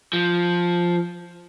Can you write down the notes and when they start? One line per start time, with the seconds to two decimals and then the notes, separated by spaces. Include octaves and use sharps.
0.13 F3